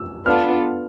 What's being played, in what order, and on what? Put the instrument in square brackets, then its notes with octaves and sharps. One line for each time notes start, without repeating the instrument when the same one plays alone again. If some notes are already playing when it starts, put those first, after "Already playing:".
Already playing: [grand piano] E6
[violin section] B3 D4 F4 A4 [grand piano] F6